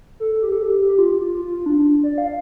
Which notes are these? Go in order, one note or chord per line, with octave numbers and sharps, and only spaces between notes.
A4
G4
A4
G4
G4
F4
F4
F4
F4
D4
D5
F5